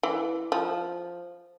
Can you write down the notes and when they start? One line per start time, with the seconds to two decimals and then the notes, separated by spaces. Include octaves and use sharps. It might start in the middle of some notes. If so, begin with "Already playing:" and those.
0.03 E3
0.52 F3